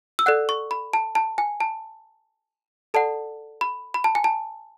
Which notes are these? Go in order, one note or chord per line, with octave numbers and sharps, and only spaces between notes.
E6
A4 D5 F#5 F#6
C#6
B5
A5
A5
G#5
A5
A4 D5 F#5 A5
B5
B5
A5
G#5
A5